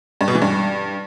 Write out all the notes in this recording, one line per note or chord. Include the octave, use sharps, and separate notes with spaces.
G2
B2
E3
G2